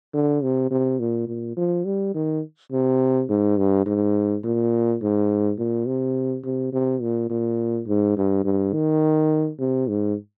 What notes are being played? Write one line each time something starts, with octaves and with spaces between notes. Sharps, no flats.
D3
C3
C3
A#2
A#2
F3
G3
D#3
C3
G#2
G2
G#2
A#2
G#2
A#2
C3
C3
C3
A#2
A#2
G#2
G2
G2
D#3
C3
G#2